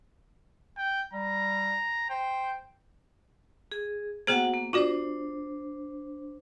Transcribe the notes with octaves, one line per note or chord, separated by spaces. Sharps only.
G5
G3 A#5
C5 G5
G#4
A#3 B3 F#4 G#4 C5 F#5
A#3
D4 F4 F#4 C5 D5